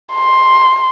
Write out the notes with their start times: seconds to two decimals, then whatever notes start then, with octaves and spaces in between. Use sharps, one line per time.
0.14 C6